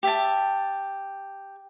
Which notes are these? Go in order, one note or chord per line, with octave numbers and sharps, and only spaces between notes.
G4 E5 A5